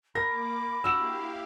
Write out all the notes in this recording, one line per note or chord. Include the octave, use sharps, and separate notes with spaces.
A#3 A#4 B5 D6 A#6
D4 E4 F#4 G4 F5 E6 E7